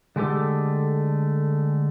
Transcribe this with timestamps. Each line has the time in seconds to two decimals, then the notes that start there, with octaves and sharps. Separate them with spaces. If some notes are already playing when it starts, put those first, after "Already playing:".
0.16 D3 G#3 A3 G4 A4